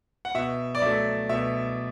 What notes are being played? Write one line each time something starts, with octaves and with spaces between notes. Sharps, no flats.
F#5
B2 E5
D5
F#3 A3 E5
B2 E5